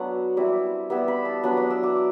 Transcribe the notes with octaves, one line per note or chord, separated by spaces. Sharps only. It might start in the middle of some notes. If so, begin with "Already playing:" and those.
Already playing: F#3 B3 D4 F#5
G3 C4 E4 D6
G3 B3 E4 E6
B5
A5
F#3 B3 D4 B5
D6
E6
D6